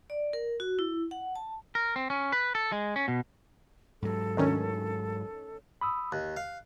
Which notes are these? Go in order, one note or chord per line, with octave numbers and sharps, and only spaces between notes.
D5
A#4
F#4
E4
F#5
A5
A#4
C4
C#4
B4
A4
G#3
C#4
B2
G#2 F#3 A4
D2 D#3 C#4
B5 D#6 E6
D#2 F#6
F5